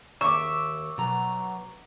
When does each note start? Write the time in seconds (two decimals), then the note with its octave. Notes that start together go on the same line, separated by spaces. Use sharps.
0.21 D#2 E5 C#6 D6
0.98 B2 F#3 A#5